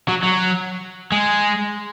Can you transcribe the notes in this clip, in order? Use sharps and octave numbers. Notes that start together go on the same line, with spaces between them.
F#3
F#3
G#3